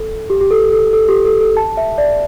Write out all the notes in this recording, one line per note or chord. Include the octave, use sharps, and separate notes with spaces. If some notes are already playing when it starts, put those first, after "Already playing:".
Already playing: A4
G4
G4
A4
A4
A4
G4
A4
A4
A5
E5
D5